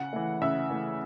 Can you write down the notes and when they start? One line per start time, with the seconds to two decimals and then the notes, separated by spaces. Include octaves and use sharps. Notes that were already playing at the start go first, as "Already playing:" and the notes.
Already playing: C#3 F#5
0.13 E3 A3
0.42 C#3 E5
0.70 E3 A3